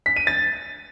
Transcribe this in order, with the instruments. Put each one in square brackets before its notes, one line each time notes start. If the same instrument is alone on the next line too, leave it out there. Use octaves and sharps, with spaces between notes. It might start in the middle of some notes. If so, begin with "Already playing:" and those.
[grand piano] B6
D#7
A6